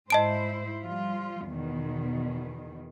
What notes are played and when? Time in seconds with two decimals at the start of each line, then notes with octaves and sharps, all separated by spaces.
0.10 G#2 E4 C5 D#5 A5 D7
0.83 F3 G3 F4
1.45 E2 B2 D#3